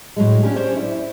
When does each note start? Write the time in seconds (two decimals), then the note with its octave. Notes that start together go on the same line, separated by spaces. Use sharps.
0.16 A2 F#3 G#3
0.43 C#4 D4 F4 G4 G#4
0.56 C#4 C5 D5
0.76 E4